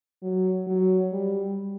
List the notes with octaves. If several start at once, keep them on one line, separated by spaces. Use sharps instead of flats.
F#3
F#3
G3